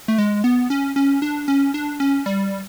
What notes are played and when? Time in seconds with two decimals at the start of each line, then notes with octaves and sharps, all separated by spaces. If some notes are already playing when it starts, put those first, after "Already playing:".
0.08 A3
0.18 G#3
0.44 B3
0.70 C#4
0.96 C#4
1.22 D4
1.48 C#4
1.74 D4
2.00 C#4
2.26 G3